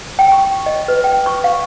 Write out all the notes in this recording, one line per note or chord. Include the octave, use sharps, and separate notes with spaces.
G5
C#6
D#5
B4
G5
C#6
F5